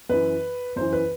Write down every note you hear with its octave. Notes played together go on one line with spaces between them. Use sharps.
F#2 E3 B4
F#2 E3 C5
B4